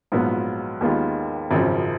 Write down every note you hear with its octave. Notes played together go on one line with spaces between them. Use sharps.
A#1 G#2 F#3 B3 F4
D#2 D#3 G#3 B3 F4
G#1 F#2 C#3 F3